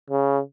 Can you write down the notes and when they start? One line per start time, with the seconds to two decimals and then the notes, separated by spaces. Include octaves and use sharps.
0.10 C#3